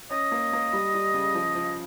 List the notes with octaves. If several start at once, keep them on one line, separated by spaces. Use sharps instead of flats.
C#4 D#5
A#3
A#3
G3
G3
C#3
F3
F3